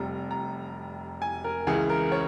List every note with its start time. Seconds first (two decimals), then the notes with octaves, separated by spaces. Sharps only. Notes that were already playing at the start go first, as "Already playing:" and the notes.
Already playing: F1 F2 C3 G3 A#5
0.31 A#5
1.22 G#5
1.44 A#4
1.67 C#2 C#3 E3 G#4
1.90 A#4
2.12 C#5